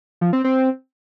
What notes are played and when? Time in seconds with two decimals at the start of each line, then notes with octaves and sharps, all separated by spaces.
0.21 F3
0.33 C4
0.44 C4